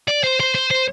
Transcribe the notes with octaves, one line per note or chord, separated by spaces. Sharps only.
D5
C5
C5
C5
C5